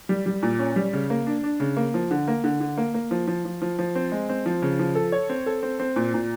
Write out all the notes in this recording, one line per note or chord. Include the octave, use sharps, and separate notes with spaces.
G3
G3
A#2
C#4
G3
C#3
A#3
D4
D4
C#3
A#3
F3
D3
A#3
D3
D3
A#3
A#3
F3
F3
F3
F3
F3
C4
G#3
C4
F3
C#3
F3
A4
C#5
C4
A4
C4
C4
A#2
A#2